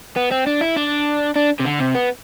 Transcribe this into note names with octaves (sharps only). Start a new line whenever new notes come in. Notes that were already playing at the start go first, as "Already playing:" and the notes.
B3
C4
D4
E4
D4
D4
C3
D3
C3
B3